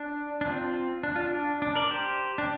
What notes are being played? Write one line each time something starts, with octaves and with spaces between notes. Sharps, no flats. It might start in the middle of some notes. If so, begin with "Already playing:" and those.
Already playing: D4
D4
C4 F4
D4
F4
D4
D4
A#4 D5
G4 C5
D4